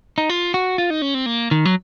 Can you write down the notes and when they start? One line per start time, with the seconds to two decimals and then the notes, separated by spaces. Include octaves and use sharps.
0.18 D#4
0.29 F4
0.54 F#4
0.78 F4
0.90 D#4
1.02 C#4
1.14 C4
1.26 A#3
1.51 D#3
1.65 F#3